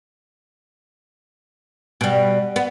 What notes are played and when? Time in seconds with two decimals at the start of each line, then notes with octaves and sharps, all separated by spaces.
2.01 B2 G3
2.56 B3